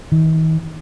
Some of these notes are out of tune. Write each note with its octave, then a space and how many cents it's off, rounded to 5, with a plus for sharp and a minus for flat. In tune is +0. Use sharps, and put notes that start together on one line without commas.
D#3 +45